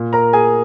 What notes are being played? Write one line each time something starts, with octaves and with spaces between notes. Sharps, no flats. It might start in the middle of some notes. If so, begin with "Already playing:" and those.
Already playing: A#2
A#4 A#5
G#4 G#5